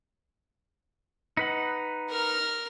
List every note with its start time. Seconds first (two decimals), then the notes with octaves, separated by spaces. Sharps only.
1.37 D#4 B4 F#5
2.09 A#4 F6